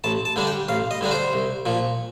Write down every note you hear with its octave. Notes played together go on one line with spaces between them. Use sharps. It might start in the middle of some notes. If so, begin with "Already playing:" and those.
A1 A5
A5
G2 D3 G3 D4
G5
A1 F5
D#5
G2 D3 G3 D4
C5
C2
A#2 F3